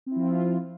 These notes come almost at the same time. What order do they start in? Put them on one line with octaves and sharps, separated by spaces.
C4 E4 F3 F4